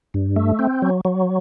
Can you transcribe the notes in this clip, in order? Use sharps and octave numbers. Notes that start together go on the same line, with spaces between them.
G2
A3
C4
F#3
F#3